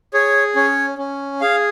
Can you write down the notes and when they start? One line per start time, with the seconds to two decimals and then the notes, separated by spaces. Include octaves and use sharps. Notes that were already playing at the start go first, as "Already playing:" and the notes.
0.14 G#4 C#5
0.56 C#4 C#5
0.98 C#4
1.41 G#4 F5